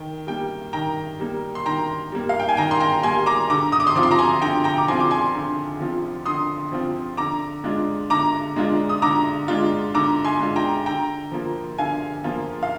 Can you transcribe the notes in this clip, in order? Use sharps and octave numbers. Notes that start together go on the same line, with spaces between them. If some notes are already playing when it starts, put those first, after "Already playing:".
Already playing: D#3 G5
G3 A#3 G5
D#3 G5 A#5
G3 A#3
C6
D#3 G5 A#5
G3 A#3
F5
G5
G#5
D#3 G5 A#5
C6
G5 A#5
G3 A#3 G#5 C6
A#5 D6
D3 A#5 D6
D#6
D6
C6 D#6
F3 C4 F4 D6
C6
A#5 D6
G#5 C6
D3 G5 A#5
G5 A#5
D6
F3 C4 F4 G#5 C6
D6
G#5 C6
D3
F3 C4 F4
D3 C6 D#6
F3 C4 F4
D3 A#5 D6
G#3 D4 F4
D3 A#5 D6
G#3 D4 F4
D#6
D3 A#5 D6
G#3 D4 F4
D3 A#5 D6
G#5 C6
G#3 D4 F4
G5 A#5
D3 G5 A#5
F3 A#3 F4
D3 F5 G#5
F3 A#3 F4
F5